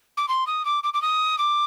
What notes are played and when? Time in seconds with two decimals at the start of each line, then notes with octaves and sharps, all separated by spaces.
0.17 D6
0.28 C6
0.47 D#6
0.65 D6
0.83 D6
0.94 D6
1.02 D#6
1.38 D6